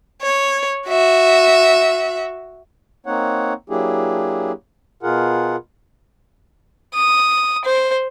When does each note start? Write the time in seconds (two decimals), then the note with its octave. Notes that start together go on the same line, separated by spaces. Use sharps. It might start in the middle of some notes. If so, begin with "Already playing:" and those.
0.22 C#5
0.87 F#4 E5
3.06 A#3 C4 D#4 C#5 F#5
3.70 F#3 A#3 D4 E4 G4 G#4
5.03 B2 F4 G#4 A#4 F#5
6.94 D#6
7.65 C5